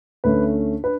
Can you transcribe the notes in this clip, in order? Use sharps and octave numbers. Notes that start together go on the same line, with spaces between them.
D2 D3 A3 C#4 B4
D4 B4